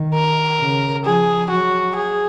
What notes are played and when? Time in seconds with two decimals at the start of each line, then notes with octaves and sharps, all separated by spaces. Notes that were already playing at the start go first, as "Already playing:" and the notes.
Already playing: D#3
0.14 A#4
0.60 C#3
1.05 F3 G#4
1.50 F#3 F#4
1.96 G#4